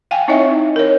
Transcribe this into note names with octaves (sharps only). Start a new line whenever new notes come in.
F5 G5 G#5
C4 D#4 E4 C#5 D#5 E5
A#4 C#5